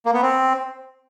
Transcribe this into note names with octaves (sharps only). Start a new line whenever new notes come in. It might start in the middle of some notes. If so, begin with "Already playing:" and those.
A#3
B3
C4